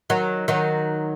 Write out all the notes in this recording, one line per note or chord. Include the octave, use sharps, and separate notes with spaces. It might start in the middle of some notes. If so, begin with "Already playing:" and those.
D#3 F#3
D#3 F#3